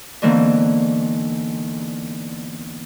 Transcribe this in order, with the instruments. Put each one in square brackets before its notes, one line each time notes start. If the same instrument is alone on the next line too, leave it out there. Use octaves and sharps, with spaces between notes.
[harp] E2 G#2 D3 E3 A#3 C4